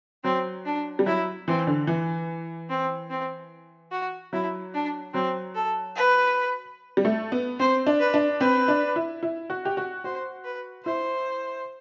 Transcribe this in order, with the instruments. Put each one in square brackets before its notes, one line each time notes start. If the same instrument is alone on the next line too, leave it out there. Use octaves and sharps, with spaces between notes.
[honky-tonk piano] F#3 [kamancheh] C4
[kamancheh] D4
[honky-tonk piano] G3
[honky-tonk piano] F#3 [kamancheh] E4
[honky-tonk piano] E3 [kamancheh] C4
[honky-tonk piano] D3
E3
[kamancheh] C4
C4
F#4
[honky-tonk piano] F#3 [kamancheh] E4
[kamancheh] D4
[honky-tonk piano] F#3 [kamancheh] C4
[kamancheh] A4
B4
[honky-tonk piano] G3
A3
B3
[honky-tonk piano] C4 [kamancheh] C5
[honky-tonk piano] D4
[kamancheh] B4
[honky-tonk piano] D4
[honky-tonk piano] C4 [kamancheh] B4
[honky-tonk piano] D4
E4
E4
F#4
G4
F#4
[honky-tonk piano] F#4 [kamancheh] C5
[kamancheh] B4
[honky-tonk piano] E4 [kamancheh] C5